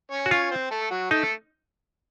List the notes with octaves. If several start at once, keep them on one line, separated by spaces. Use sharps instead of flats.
C#4 C#5
F#4
C#4 F4 C#5
C4 C5
A3 A4
F#3 F#4
A3 D#4 A4